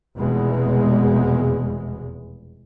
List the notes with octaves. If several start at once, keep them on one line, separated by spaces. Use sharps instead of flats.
F1 E2 B2 G#3